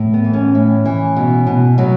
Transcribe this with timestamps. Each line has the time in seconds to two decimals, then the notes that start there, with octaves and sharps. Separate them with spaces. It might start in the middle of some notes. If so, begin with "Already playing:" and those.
Already playing: A2
0.14 B3
0.24 E3
0.33 C#4
0.55 A2
0.85 E3
1.17 B2
1.47 B2
1.78 B2 F#3